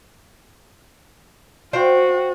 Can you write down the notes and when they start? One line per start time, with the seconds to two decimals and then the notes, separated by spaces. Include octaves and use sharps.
1.73 F#4 C5 F5 G5